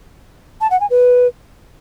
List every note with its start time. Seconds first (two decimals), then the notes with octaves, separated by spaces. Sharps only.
0.61 A5
0.70 F#5
0.80 G#5
0.90 B4